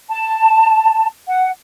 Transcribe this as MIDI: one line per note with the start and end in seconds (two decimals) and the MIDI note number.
0.10 1.06 81
1.28 1.49 78